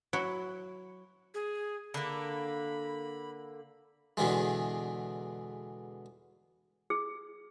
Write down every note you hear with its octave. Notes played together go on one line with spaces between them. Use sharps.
F#3 E4 F#4
G#4
D3 A#3 B5
E2 B2 D3 E3 G#3
G#4